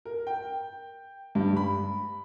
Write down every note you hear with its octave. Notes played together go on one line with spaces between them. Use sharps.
A#4
G5
G2
B5